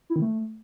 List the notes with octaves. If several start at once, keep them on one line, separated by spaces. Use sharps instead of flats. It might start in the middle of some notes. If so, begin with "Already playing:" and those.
E4
D#3
A3